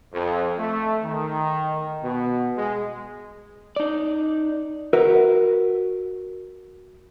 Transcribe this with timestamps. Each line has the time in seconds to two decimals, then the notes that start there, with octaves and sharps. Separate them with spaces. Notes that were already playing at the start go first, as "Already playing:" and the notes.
0.13 F2
0.58 A3
1.04 D#3
2.03 B2
2.57 G#3
3.76 D#4 D5
4.93 F#4 A#4 B4 E5